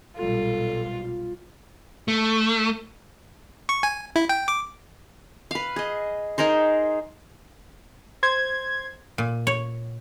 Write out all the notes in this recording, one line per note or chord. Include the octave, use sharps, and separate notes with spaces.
B1 A#2 G3 F4 A4
F4
A3
C#6
G#5
E4
G5
D6
B4 F5
G#4 D#5
D#4 G#4 A#4 C5
C5 G#6
A#2
C#5